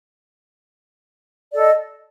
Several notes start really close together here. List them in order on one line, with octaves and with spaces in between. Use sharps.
D5 A4 D#5